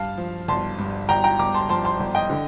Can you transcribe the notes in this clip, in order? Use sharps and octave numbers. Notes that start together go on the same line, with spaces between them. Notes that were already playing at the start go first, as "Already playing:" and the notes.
Already playing: G2 F5 A5
F3
G1 A5 C6
G2
G1 G5 A#5
G5 A#5
G1 A#5 D6
A5 C6
F3 A5 C6
A5 C6
G1
D#5 G5
D3